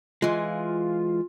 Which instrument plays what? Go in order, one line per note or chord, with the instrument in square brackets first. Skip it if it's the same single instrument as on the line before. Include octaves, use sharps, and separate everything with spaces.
[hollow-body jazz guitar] E3 G#3 [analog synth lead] F4